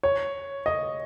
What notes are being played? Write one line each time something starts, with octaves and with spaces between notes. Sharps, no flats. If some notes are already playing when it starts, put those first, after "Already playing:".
C#5
D#5